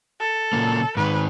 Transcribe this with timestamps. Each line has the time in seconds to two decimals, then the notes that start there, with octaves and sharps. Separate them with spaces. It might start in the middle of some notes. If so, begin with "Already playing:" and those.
0.20 A4
0.53 A#2 C#3 A#3
0.97 G#2 D#3 B4